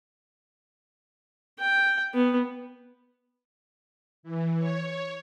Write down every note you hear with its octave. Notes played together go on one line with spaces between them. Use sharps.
G5
B3
E3
C#5